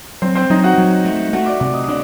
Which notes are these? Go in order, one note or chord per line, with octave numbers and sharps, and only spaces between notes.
F#3 C4 C5
C4 C5
F#3 D#4 D#5
F#4 F#5
F#3
A3
A3 F#4 F#5
D5 D6
C3 D5 D6
D#5 D#6
D#6
D4 D5 D6